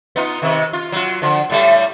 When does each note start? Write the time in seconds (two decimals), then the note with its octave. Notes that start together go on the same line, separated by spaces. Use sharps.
0.16 B3 D#4 F4
0.42 C3 D#3
0.73 F4
0.92 F#3 F4
1.22 D3 F3
1.50 A2 G3 A3